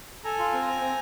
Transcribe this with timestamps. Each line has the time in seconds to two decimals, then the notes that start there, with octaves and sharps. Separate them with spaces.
0.24 A4 G#5 A#5
0.39 F4
0.53 C4
0.67 C4
0.81 C4